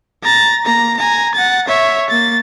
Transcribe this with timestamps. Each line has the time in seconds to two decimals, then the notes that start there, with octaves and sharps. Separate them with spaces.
0.23 A#5 A6
0.65 A#3 A#5
0.97 G#5 A#5
1.34 F#5 A6
1.67 C#5 E5
2.09 A#3 A6